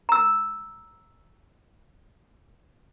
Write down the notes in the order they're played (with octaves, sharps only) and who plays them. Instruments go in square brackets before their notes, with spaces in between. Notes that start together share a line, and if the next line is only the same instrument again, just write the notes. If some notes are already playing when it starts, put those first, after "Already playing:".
[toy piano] A#5 E6